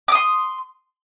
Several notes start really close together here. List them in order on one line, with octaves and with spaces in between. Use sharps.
D6 D#6 C6